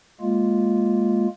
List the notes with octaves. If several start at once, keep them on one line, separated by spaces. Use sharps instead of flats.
G#3 A#3 F4